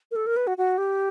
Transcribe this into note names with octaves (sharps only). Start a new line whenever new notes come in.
A#4
A4
A#4
B4
F#4
F#4
G4